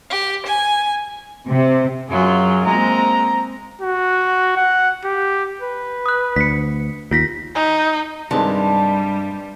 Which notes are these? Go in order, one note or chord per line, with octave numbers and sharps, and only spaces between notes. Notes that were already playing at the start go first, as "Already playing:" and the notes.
G4
G#5
C3
F#2 F#3 F4 G#4
G#3 A#3 C4 A#5
F#4
F#5
G4
B4
D#6 F#6
D2 B6 C#7
D#2 F4 A#6 B6
D#4
G2 C3 D#3 G3 G#3 A5